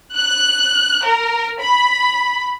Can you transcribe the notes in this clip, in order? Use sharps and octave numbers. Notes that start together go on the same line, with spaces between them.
F#6
A#4
B5